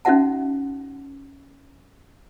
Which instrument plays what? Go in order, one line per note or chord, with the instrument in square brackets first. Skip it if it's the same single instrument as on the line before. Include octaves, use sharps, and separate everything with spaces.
[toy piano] C#4 D#4 F#4 E5 F#5 A5